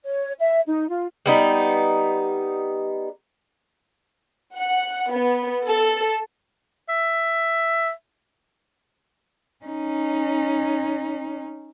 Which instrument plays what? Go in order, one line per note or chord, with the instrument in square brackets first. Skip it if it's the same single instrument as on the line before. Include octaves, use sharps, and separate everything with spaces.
[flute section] C#5
E5
D#4
F4
[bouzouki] G3 B3 D#4
[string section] F#5
B3
A4
[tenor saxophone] E5
[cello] C#4 D#4